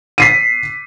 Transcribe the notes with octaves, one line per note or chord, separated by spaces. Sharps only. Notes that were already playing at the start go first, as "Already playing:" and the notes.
B6 C7 D#7